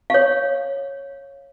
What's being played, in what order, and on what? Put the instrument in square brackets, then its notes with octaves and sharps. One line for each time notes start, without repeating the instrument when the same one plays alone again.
[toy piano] C#5 F5